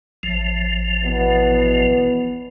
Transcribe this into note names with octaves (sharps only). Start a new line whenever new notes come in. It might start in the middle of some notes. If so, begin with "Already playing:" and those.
A1 F3
E2 B2 B3